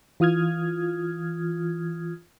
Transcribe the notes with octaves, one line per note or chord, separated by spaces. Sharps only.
E3 F4 D#6 F6 G#6